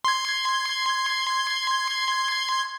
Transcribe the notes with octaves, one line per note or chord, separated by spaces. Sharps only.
C6 G#6